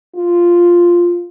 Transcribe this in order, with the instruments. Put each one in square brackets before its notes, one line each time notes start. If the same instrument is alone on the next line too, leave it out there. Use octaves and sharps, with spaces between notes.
[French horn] F4